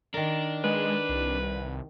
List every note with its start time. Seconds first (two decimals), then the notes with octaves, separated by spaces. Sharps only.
0.14 D#3 D4 A#4
0.64 G#3 B4
1.09 C2